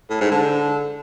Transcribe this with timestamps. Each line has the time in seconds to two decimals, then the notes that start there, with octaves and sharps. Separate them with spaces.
0.10 A2
0.21 G#2
0.31 D3